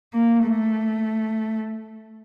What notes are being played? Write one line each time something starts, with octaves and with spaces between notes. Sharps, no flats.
A#3
A3